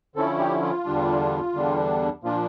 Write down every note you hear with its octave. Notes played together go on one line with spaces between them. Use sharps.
D3 F3 C#4 E4 A4
G4
F4
E2 D3 G3 D4
E2 D3 G3 D4
A#2 F3 A#3 D4 F4